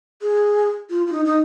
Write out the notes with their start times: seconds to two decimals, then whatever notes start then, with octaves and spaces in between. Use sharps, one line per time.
0.22 G#4
0.90 F4
1.07 F4
1.12 D#4
1.25 D#4